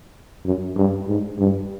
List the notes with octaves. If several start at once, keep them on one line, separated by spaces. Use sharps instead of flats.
F#2
G2
G#2
G2